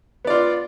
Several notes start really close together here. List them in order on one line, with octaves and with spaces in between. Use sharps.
B3 D5 F4